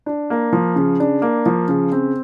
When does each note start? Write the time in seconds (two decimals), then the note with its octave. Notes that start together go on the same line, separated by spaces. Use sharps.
0.06 D4
0.30 A#3
0.53 F3
0.76 C#3
1.00 D4
1.22 A#3
1.46 F3
1.68 C#3
1.92 C4